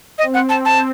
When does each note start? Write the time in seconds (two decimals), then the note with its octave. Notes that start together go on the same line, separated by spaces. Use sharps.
0.18 C4 D#5
0.34 F#5
0.49 A5
0.65 A5